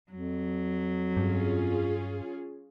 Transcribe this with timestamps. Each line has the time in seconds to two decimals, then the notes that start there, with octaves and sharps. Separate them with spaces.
0.11 F2 F#3
1.17 G2 C#4 F4 G#4